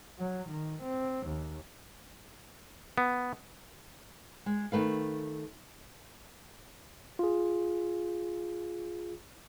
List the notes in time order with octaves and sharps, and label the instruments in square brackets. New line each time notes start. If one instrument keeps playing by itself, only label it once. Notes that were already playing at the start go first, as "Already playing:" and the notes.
[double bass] F#3
D#3
C4
D#2
[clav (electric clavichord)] B3
[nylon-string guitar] G#3
D#3 A3 B4 F5
[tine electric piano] F4 G#4